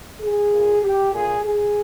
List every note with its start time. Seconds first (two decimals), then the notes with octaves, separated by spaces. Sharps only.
0.20 G#4
0.52 A#2
0.82 G4
1.12 A#2 G#4
1.43 G#4